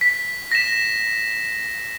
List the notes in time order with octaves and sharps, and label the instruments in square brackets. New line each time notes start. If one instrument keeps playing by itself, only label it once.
[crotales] B6
A#6 B6 E7